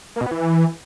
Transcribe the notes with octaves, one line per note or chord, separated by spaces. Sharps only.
A#3
B2
B3
E3